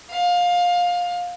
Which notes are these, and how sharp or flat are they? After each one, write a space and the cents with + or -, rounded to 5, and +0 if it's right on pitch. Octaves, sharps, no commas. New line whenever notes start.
F5 +20